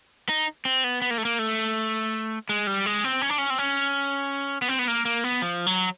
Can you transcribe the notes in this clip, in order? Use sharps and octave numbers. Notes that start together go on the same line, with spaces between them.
D#4
C4
B3
B3
A#3
A3
A#3
A3
G#3
G3
G#3
C4
C#4
D4
C#4
C4
C#4
B3
C4
B3
A#3
A#3
B3
F3
F#3